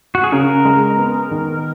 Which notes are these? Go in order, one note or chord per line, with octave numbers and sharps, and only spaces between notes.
F#4
G#4
C#3 A#4
G#3
B3
D#3